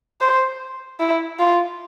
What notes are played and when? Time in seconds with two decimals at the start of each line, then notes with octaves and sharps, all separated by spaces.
0.21 C5
1.00 E4
1.39 F4